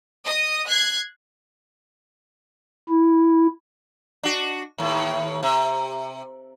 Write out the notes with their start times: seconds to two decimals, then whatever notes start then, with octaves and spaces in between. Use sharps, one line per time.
0.24 D#5 D#6
0.67 F#6 G#6 C7
2.89 E4
4.23 D4 F#4
4.78 D#2 A2
5.43 C3